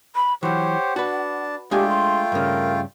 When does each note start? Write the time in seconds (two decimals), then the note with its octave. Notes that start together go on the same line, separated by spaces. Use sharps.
0.15 B5
0.43 E3 F#3 G4 C5 C#5 F#5
0.96 D4 F#4 B4 A5
1.71 G#3 A3 D4 F4 G4 G5 G#5
1.88 C6
2.32 G2 C#3 A#4